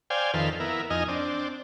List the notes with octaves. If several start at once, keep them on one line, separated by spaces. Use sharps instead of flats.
C5 D5 F5 G5 G#5
F2 D#3 A4 B4 F5 C6
B3 E4 A#4
F2 D#4 D#5 G#5 F6
C4 D4